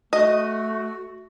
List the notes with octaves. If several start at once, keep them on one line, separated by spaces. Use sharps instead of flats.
A3 F#4 D#5